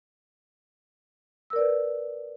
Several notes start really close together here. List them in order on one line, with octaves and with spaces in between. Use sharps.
E6 A#4 D5 B4